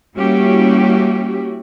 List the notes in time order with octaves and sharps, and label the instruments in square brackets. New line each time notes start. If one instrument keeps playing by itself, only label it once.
[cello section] G3 A#3 C#4 E4 F#4 G4